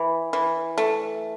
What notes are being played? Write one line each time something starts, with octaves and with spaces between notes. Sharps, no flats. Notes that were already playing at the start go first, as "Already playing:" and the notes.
Already playing: E3
E3
A3